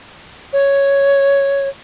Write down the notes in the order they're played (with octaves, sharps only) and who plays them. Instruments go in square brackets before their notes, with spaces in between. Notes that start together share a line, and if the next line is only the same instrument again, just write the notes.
[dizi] C#5